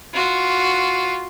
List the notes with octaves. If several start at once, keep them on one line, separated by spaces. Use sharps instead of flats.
F4 F#4